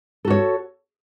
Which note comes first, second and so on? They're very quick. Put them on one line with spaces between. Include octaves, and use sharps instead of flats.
A4 F#4 C#5